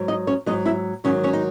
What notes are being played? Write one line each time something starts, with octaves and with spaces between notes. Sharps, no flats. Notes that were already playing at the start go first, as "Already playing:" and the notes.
Already playing: G#2 F#3
D#4 D#5
C#4 C#5
G#2 D#3 F#3 D#4 D#5
E4 E5
G#2 D#3 F#3 C#4 C#5
C#4 C#5
D#4